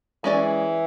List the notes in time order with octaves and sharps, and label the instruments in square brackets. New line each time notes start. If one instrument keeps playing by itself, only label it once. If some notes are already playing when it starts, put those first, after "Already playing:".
[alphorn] E3 [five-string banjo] G#3 C#4 G#4 D5